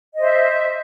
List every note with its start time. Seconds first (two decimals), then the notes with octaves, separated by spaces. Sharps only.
0.15 D#5
0.18 C5
0.21 E5